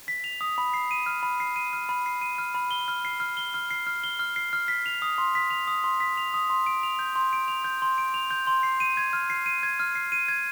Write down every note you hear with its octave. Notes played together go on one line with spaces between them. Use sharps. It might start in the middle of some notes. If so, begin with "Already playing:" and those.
B6
F7
D#6
B5
C7
D#7
F6
B5
C7
D#7
F6
B5
C7
D#7
F6
B5
G7
F6
C7
F6
G7
F6
C7
F6
G7
F6
C7
F6
B6
F7
D#6
C6
B6
F7
D#6
C6
B6
F7
D#6
C6
D7
F7
G6
C6
D7
F7
G6
C6
D7
F7
G6
C6
C7
D#7
G#6
F6
C7
D#7
G#6
F6
C7
D#7
G#6